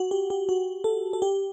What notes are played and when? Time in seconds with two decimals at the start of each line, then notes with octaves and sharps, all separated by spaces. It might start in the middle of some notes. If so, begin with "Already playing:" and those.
Already playing: F#4
0.11 G4
0.30 G4
0.49 F#4
0.84 A4
1.13 A4
1.22 G4